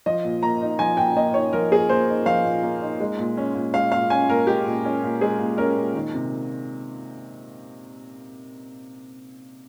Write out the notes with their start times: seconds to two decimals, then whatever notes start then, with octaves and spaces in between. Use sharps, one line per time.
0.06 F3 D#5
0.24 A#2
0.43 A#3 A#5
0.61 D#4
0.79 F3 G#5
0.97 A#2 G5
1.16 A#3 D#5
1.34 D#4 C#5
1.53 F3 A#4
1.71 A#2 G#4
1.89 A#3 C5
2.08 D#4
2.26 F3 F5
2.44 A#2
2.63 A#3
2.82 D#4
3.00 G#3
3.18 A#2
3.37 C#4
3.55 A#2
3.74 G#3 F5
3.92 A#2 F5
4.10 C#4 G#5
4.29 A#2 A#4
4.47 G#3 G4
4.66 A#2
4.85 C#4
5.03 A#2
5.21 G#3 G#4
5.39 A#2
5.57 C#4 A#4
5.76 A#2
5.94 D#3
6.14 C3